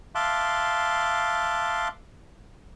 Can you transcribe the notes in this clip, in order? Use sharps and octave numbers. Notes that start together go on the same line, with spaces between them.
E5 F5 A5 C6 D6 F#6